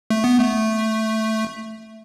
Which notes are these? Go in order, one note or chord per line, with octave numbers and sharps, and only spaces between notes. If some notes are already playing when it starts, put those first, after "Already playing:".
A3
B3
A3